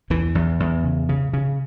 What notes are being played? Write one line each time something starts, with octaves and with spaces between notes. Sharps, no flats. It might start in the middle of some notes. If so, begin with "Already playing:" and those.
E2 E3
E2
E2
C#3
C#3
C#3